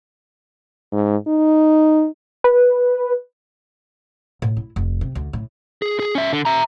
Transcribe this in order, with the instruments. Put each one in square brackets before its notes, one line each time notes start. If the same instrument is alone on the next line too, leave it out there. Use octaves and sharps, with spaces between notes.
[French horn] G#2
D#4
[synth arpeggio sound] B4
[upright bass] A2
E4
F1
C3
D2
A2
[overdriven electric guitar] G#4
G#4
C#4 E5
D3
E5 A#5